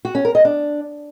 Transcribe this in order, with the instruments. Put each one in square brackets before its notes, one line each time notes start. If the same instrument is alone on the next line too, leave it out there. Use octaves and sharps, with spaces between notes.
[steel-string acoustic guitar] F#4
C#4
A#4
D#5
D4